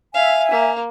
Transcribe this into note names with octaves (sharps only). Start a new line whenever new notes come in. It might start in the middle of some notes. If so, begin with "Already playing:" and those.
E5 F5 G#5
A#3